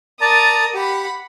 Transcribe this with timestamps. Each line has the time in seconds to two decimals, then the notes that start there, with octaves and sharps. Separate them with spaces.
0.21 A#4 D5 A5 A#5 D#6
0.75 G4 F#5 B5